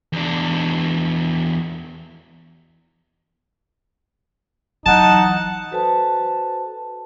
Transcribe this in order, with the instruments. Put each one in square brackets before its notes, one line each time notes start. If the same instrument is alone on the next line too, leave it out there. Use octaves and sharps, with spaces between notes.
[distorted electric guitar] E2 D4
[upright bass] E3 F#3 [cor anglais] D#4 [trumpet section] F#5 [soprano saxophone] A5
[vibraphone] F#4 A4 B4 C5 G#5 A5